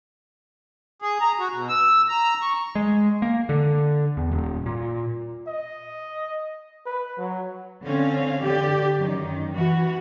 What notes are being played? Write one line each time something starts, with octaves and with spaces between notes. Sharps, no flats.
G#4
A#5
F#4
B2
E6
A#5
C#6
G#3
A#3
D3
E2
D#1
A#2
D#5
B4
F#3
D3 C4 C#4 F5
D3 G4 D5
F#2 D#3
E3 F#4